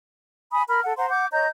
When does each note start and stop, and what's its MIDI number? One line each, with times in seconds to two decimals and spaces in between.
0.51 0.62 80
0.51 0.62 83
0.51 0.62 87
0.68 0.80 70
0.68 0.80 83
0.68 0.80 89
0.83 0.93 69
0.83 0.93 78
0.97 1.09 72
0.97 1.09 78
0.97 1.09 82
0.97 1.09 84
1.09 1.26 78
1.09 1.26 86
1.09 1.26 91
1.31 1.46 73
1.31 1.46 75
1.31 1.46 82
1.31 1.46 91